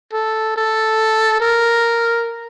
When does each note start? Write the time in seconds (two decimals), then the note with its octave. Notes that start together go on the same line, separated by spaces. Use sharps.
0.13 A4
0.56 A4
1.41 A#4